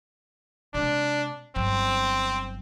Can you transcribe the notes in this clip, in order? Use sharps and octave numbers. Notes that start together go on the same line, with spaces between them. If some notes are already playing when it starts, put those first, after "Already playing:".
C3 G#3 D4
G1 F#3 C4